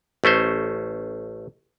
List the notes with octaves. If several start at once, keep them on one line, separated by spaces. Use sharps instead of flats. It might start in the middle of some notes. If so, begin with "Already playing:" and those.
A1 A3 C#4 C5